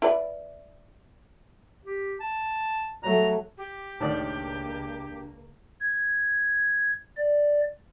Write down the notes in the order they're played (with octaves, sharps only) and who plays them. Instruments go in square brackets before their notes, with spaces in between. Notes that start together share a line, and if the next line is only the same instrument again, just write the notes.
[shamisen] E4 B4 D5
[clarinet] G4
A5
[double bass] F#3 A3 [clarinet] A#5
[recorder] G4
[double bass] C#2 A#3 [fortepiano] A2 D#3 D5 [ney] D4
[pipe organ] G#6
D5